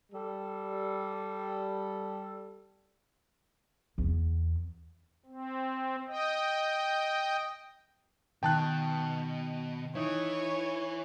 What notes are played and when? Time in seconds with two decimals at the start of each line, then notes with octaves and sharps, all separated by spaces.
0.12 G3 A4
3.98 E2 B3
5.26 C4
6.08 D#5 G5
8.43 B2 D#3 G5 A5 F#6 C7
9.95 E3 D#4 E4 C#5